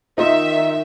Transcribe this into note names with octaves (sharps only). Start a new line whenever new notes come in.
D#3 D#4 F4 E5